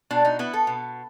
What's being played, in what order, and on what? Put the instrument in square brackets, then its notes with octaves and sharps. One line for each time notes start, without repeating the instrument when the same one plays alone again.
[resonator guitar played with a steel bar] B2 D4
D#4
B3 E4
A4
B2